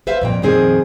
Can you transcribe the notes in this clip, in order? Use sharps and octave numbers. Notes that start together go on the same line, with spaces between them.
B4 C5 E5 F5
F2 A#2 G5
F2 A#2 D#3 C4 G#4